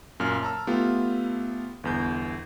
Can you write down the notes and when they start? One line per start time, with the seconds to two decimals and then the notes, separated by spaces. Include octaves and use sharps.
0.20 F#2 A#2 F4 F6
0.43 A5 A#5 E6
0.67 A3 B3 F4 G4
1.84 G1 E2 G6